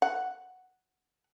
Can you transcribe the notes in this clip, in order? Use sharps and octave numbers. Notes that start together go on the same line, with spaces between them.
F#5